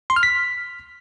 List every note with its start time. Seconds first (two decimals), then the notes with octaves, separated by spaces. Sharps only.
0.10 C6
0.16 F6
0.23 B6